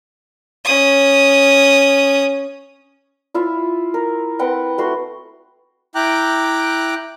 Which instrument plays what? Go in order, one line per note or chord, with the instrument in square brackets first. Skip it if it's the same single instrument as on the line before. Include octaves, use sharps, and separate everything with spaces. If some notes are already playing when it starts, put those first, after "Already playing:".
[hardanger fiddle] C#4 D#6
[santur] E4 F4 E5
A#4
C4 B4 F#5 G5
A3 F#4 C6
[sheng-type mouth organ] E4 G5 A#5 D6 F#6